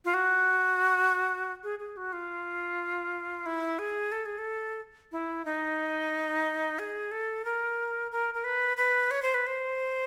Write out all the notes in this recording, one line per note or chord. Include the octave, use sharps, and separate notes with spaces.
F4
F#4
G#4
G#4
F#4
F4
E4
G#4
A4
G#4
A4
E4
D#4
G#4
A4
A#4
A#4
A#4
B4
B4
C#5
C5
B4
C5